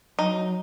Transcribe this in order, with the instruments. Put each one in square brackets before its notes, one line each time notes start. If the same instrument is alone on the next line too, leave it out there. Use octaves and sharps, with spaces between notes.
[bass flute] F#3 [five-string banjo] D#4